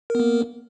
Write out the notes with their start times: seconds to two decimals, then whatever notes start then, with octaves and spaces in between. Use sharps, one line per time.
0.10 A#4
0.15 B3
0.20 A#3